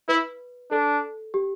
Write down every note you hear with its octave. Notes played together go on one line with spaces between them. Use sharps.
E4 B4
D4 A4
G4